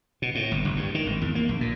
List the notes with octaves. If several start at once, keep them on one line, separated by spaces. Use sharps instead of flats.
B2
A2
G1
F#1
G2
D#3
G#1
E2
A#3
A#1
A#2